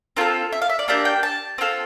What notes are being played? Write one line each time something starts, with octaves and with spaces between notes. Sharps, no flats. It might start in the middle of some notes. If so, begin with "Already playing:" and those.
C4 F4 A4 A#4
E5
F5
E5
D5
A#3 D4 G4 E5
G5
A5
C4 F4 A4